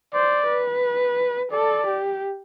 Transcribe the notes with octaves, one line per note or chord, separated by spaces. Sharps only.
C5 D5
B4
A4 D5
G4